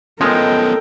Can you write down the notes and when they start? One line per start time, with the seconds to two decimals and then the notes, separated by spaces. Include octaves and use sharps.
0.21 F3 G#3 B3 C#4 A4 A#4 D#5 G5